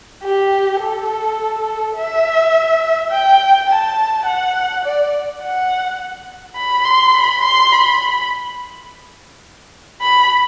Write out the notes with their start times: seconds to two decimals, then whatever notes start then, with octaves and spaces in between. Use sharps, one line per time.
0.24 G4
0.82 A4
1.97 E5
3.11 G5
3.70 A5
4.26 F#5
4.85 D5
5.41 F#5
6.57 B5
6.85 C6
7.14 B5
7.43 C6
7.72 B5
10.02 B5